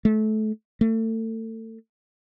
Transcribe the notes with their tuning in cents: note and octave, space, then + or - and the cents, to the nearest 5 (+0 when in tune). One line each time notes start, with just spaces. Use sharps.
A3 -25
A3 +30